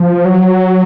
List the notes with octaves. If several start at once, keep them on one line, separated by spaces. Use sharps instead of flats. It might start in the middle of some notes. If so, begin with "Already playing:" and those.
Already playing: F3
F#3